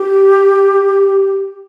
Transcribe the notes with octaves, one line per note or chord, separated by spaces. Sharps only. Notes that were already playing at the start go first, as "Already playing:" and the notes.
Already playing: G4